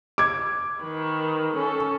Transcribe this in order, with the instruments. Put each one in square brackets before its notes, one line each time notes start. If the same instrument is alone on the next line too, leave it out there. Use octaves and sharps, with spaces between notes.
[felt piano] D6 G#6
[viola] D#3 B4
C#4 A4